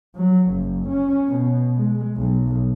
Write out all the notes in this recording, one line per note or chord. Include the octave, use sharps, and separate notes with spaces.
F#3
F#1
C#4
B2
G#3
B1